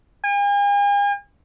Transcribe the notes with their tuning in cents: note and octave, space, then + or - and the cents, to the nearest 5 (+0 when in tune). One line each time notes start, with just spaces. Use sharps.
G#5 -45